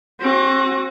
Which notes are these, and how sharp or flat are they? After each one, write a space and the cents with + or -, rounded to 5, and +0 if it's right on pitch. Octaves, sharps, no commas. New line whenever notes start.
C4 +35 F#4 +0